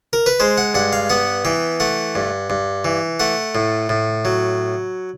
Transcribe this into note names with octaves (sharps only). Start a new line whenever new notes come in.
A#4
B4
G#3 C5
F#5
G2 F#5
F5
B3 F#5
E3 G5
A3 F#5
G2
G2
E3
A3 F#5
A2
A2
F#3